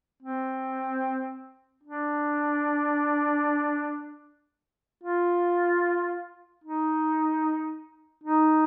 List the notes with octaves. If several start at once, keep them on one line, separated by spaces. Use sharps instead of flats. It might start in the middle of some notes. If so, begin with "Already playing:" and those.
C4
D4
F4
D#4
D#4